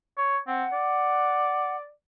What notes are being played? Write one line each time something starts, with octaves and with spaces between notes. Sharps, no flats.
C#5
C4 F#5
D5